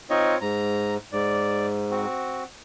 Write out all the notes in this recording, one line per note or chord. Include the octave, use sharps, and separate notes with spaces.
C4 D#4 F4 C#5 D#5
G#2 A#5
G#2 D5
C4 F#4